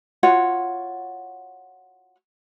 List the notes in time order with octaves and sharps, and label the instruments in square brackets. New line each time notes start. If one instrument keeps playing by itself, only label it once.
[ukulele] F4 F#4 C#5 F#5